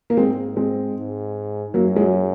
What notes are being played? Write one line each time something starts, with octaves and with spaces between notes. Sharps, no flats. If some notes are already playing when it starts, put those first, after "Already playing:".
A#3
G#2 G#3 C4
G#3 C4
G#2
F#2 F#3 A#3
G#3
F#3